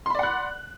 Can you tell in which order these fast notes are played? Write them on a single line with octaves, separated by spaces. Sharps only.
C6 B5 D5 F#5 F#6